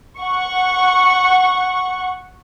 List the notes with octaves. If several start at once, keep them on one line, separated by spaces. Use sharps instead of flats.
F#5 C#6